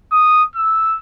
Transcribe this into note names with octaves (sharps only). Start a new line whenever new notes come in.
D#6
E6